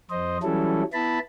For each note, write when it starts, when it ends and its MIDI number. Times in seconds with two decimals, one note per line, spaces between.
0.10 0.38 41
0.10 0.38 72
0.10 0.38 75
0.43 0.83 52
0.43 0.83 54
0.43 0.83 55
0.43 0.83 61
0.43 0.83 64
0.43 0.83 69
0.93 1.19 59
0.93 1.19 64
0.93 1.19 81
0.93 1.19 83